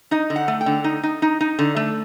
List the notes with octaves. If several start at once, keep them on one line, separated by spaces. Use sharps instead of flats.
D#4 D#5
D3
F#5
A3
G5
D3
D#4
D#4
D#4
D#4
D3
A3